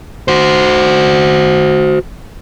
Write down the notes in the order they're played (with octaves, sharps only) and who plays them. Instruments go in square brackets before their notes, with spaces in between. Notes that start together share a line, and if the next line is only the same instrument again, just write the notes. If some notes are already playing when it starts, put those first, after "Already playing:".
[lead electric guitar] F#4 C5